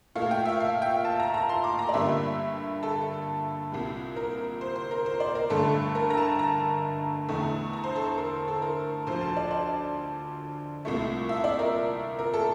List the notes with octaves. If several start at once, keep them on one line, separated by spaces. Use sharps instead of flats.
A#2 A3 F5
G5
E5
F5
G5
A5
A#5
A#5
C6
D6
A#5
D5
G2 D3 G3 A#3 E5
A4
C2 A#2 G3
A#4
C5
C5
A#4
C5
D5
A#4
G2 D3 A3 A4
A#4
A#5
A5
A#5
E2 D3 A3
A#5
C5
A4
A#4
A4
A#4
D2 D3 F3 C5
A5
D5
D5
C2 A#2 A3
E5
D5
A#4
A#4
A4